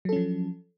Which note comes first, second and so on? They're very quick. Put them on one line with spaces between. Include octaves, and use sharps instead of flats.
F#3 A4 C#4 F3